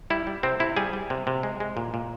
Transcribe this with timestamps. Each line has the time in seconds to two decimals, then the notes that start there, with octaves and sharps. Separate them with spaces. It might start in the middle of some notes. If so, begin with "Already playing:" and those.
0.10 G3 E4
0.27 G3
0.43 C3 C4
0.60 C3 E4
0.77 G3 G#4
0.93 G3
1.10 C3
1.27 C3
1.43 G#3
1.60 G#3
1.77 A#2
1.94 A#2